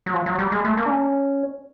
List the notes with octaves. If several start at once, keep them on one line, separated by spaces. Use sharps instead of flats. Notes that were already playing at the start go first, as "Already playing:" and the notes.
F#3
F3
F#3
G3
G#3
A3
A#3
D4
C#4